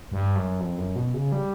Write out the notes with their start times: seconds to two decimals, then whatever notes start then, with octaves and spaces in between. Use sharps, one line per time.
0.12 G2
0.36 F#2
0.60 F2
0.78 F#2
0.96 B2
1.14 C#3
1.32 G3